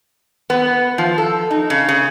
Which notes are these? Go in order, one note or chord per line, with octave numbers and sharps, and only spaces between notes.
B3
F3
A4
D#4
C#3
C#3